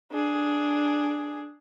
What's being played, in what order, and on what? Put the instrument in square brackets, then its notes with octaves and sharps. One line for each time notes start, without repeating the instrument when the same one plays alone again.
[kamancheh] D4 G#4